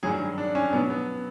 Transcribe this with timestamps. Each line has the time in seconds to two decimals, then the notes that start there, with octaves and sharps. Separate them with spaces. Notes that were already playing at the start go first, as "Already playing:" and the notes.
0.03 G2 D#3 F#3 G#4
0.38 D4
0.55 C#4
0.73 B2 B3
0.76 F#3
0.90 B3